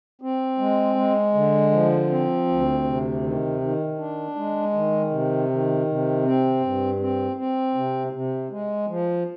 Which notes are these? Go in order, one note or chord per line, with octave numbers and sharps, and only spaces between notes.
C4
G#3
G#3
D3
F3
C4
D2
C3
D#3
D#3
D4
G#3
D#3
C3
D#3
C3
C4
G2
C4
C4
C3
C3
G#3
F3